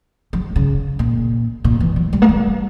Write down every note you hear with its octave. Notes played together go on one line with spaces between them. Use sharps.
F#3
C#3
A#2
A#2
E3
F#3
G3
A#3
G3